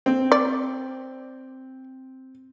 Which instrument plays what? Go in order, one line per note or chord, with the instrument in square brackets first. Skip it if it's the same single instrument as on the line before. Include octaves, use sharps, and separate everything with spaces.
[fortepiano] C4
[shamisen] D5